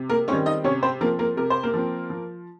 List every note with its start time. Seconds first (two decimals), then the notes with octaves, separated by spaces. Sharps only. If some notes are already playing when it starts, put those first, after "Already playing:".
Already playing: C3
0.09 A#3 A#4
0.28 D#3 G3 C4 C#4 C#5
0.46 D#4 D#5
0.64 C3 C#4 C#5
0.83 C4 C5
1.01 F3 A#3 C4 A#4
1.19 A#3 A#4
1.37 C3 A#4
1.50 C5
1.63 A#3 A#4
1.74 F3 C4
2.10 F3